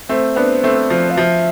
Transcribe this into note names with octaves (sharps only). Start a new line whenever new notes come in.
A3 C4 C5
B3 D4
A3 C4
F3
F5
F3 E5